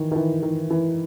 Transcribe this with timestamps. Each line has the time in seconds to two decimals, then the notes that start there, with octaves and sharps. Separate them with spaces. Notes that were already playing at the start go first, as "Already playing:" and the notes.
Already playing: D#3 E3
0.11 D#3
0.16 E3
0.43 D#3
0.70 E3